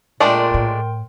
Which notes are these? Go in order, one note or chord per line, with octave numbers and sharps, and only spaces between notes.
A#2 G#3 A3 D4 A#4 G5 C6
A2